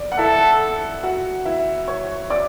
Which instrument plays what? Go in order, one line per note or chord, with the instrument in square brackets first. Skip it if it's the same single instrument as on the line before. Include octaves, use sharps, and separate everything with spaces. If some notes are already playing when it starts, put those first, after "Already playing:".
Already playing: [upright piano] D5
F#5
[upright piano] E4 E5 [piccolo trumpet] A4
[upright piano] F#4 F#5
E4 E5
C#5 C#6
D5 D6